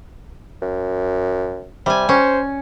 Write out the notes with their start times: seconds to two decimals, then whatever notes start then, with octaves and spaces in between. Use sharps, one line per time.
0.62 F#2
1.86 C3 G3 G#5
2.09 C#4 C5